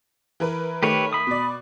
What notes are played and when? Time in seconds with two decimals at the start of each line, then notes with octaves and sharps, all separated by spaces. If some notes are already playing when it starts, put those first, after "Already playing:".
0.40 E3 A#4 B4
0.83 D#3 A3 G4 B4 C#5
1.13 B5 D#6
1.27 B2 D5